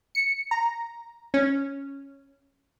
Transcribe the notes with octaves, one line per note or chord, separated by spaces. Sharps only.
C#7
A#5
C#4